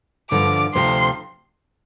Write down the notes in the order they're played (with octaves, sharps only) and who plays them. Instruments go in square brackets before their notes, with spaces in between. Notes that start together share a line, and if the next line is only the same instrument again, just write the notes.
[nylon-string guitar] G2 D3 F3 [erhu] D6
[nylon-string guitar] D2 C3 F3 C4 [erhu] C6